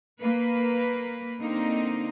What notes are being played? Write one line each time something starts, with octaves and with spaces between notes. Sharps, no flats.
A#3 B4
D3 A#3 C4 D#4